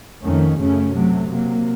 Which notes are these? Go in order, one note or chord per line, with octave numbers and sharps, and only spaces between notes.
F2 D#3 A3 C#4
F#2 C#3 A3 C#4
C3 F#3 A3
C3 F#3 A#3